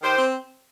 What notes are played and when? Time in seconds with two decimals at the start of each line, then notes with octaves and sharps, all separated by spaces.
0.02 D#3 G4 C5
0.18 C4